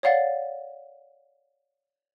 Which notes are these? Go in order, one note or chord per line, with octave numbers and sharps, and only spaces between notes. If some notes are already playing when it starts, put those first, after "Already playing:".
C#5 D5 F5 F#5 A6